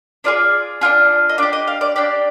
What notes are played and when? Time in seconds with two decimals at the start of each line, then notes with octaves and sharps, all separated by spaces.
0.24 D4 F4 G#4 D5
0.81 D4 F4 G#4
1.29 D#5
1.38 D4 G4 D5
1.53 D#5
1.68 F5
1.81 D5
1.96 D4 G4 D5